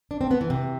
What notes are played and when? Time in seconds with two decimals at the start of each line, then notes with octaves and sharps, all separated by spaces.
0.11 D4
0.21 C4
0.31 B3
0.41 E3
0.50 C3